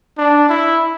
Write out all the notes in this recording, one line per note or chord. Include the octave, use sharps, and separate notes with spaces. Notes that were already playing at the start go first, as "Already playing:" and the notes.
D4
E4